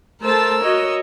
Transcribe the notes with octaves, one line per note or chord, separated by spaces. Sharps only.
A3 A#4 C5 A5 E6
F#4 C#5 D#5